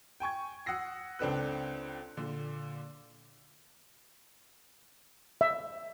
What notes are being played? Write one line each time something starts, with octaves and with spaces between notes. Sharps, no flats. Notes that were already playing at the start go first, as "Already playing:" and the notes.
G5 G#5 C#6 G#6
F#5 D#6 E6 A#6 C7
C#2 C4 D4 A4 B4 F#6
A#2 D3
E5